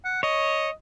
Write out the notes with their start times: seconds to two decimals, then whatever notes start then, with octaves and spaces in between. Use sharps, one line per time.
0.05 F#5
0.23 C#5 D#5